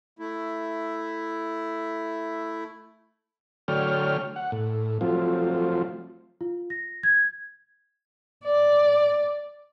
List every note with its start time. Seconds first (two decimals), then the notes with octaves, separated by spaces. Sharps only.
0.19 A3 E4
3.68 D3 F#3 A3 C#5 G5 F6
4.36 F#5
4.52 A2
5.01 F3 F#3 A3 C4 F4
6.41 F4
6.70 A#6
7.03 G#6
8.45 D5